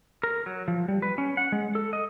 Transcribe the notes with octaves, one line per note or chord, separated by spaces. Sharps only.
A#4
F#3
F3
G3
B4
C#4
F#5
G#3
A4
D#5